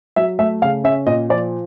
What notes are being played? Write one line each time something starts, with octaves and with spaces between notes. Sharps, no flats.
F#3 E5
A3 E5
C#3 F5
C#4 E5
A#2 D#5
F3 D5